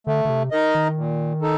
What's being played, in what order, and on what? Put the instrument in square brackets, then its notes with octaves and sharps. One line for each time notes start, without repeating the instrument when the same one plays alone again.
[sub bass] D3 [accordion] A3
[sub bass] D3
C3
[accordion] D#4 A#4 D#5
[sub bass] D#3
[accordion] A#2
D#4 A4